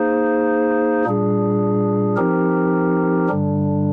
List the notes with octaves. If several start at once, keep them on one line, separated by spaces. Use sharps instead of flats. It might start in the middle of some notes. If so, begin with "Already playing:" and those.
Already playing: A#3 D#4 G#4 C5
A#2 G3 D4 G#4
F3 C4 D#4 G4 A#4
G2 D3 G3 D4